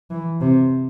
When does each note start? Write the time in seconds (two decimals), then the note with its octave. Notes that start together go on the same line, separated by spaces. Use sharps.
0.11 E3
0.41 C3